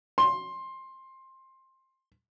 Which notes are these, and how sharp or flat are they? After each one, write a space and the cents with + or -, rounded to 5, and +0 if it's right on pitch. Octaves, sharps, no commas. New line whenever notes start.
C6 +15